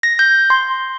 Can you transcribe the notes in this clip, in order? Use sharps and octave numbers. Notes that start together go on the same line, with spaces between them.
A#6
G6
C6